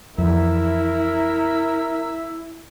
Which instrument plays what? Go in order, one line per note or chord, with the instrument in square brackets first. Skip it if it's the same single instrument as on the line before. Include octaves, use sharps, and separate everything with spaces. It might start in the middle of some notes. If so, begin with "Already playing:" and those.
[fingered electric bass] F2 E3 [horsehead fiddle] E4 [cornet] A#4 [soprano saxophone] E5